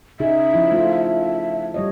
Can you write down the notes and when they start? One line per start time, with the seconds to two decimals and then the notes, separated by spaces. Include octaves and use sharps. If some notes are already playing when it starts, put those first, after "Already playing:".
0.20 C#3 D#4 G#4 E5
0.54 F3 E4
0.72 A3 F4
1.74 G3 C#5 D#5